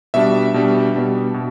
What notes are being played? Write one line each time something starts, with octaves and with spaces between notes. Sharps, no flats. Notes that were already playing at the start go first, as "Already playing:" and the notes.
B2 G3 D4 E5
B2 G3 D4
B2 G3 D4
B2